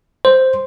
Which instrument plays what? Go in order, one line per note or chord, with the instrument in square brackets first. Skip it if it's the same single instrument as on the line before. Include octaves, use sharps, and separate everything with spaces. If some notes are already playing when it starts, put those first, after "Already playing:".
[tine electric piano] C5